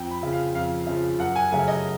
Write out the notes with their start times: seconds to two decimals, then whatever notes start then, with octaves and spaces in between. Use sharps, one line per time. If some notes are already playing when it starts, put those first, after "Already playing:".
Already playing: F2 G5
0.11 B5
0.23 C#3 F3
0.33 F5
0.54 F2 F5
0.87 C#3 F3
1.19 F#2 F#5
1.36 G#5
1.51 C#3 F#3 A3 G#5
1.68 D#5